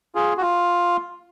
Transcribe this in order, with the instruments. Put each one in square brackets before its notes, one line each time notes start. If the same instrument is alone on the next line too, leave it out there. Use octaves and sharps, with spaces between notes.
[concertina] F4 G#4
F#4
F4